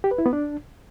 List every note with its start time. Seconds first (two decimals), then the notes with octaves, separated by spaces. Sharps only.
0.04 G4
0.11 B4
0.18 E4
0.26 B3
0.33 D4